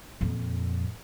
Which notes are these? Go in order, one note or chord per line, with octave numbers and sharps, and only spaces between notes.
F2 A#2